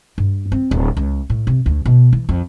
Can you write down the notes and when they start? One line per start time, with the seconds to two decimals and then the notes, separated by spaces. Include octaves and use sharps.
0.18 G2
0.52 C4
0.71 D1
0.97 C#2
1.30 A2
1.47 C3
1.66 D2
1.85 B2
2.13 E3
2.29 F2